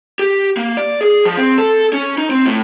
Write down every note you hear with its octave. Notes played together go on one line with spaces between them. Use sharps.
G4
A#3
D5
G#4
F3
C4
A4
C#4
D#4
C4
A2